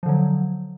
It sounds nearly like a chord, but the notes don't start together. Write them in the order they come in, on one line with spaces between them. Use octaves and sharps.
F3 D3 F#3